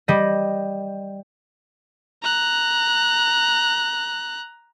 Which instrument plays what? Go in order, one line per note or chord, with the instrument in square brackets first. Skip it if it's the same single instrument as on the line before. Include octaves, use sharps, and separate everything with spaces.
[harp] G3 D#5
[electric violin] A#5 F#6